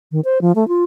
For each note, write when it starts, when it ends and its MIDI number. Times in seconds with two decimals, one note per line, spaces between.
0.12 0.20 51
0.25 0.41 72
0.41 0.52 53
0.55 0.67 57
0.68 0.84 65